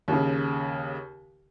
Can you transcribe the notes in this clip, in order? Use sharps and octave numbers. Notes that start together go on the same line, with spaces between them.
D#2 C#3